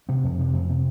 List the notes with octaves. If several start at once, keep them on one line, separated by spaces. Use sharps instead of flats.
C3 C4
F2
C3
F2
C3